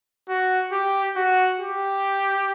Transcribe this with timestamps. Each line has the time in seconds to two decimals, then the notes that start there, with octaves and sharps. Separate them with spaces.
0.28 F#4
0.72 G4
1.15 F#4
1.59 G4